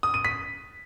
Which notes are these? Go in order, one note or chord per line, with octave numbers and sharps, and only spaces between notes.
D#6
D#7
B6